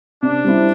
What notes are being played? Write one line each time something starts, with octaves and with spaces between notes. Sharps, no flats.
C3 D4
G3 C4 E4